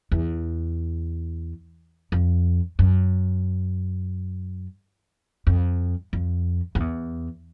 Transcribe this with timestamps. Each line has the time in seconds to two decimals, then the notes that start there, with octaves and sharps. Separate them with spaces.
0.12 E2
2.12 F2
2.79 F#2
5.47 F2
6.13 F2
6.75 F2
6.80 E2